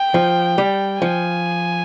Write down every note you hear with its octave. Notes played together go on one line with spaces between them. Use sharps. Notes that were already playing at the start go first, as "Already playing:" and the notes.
Already playing: G5
F3
G3
F3 G#5